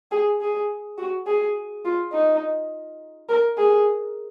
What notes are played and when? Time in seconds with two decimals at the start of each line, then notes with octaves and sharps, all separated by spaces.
0.11 G#4
0.41 G#4
0.98 F#4
1.27 G#4
1.85 F4
2.13 D#4
3.29 A#4
3.57 G#4